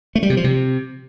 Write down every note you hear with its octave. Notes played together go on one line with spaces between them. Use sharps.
A3
G3
C3
F3
C3